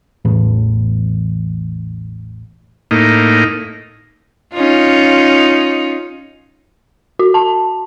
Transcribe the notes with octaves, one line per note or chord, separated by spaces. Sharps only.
A1 E2 A2
A2 A#3 D#4
C#4 D#4 F4
F#4
A5